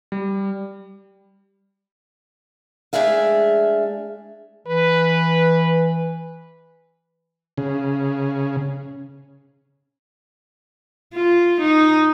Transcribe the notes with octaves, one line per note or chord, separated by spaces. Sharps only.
G3
G#3 A3 D4 G#4 E5 F5
E3 B4
C#3
F4
D#4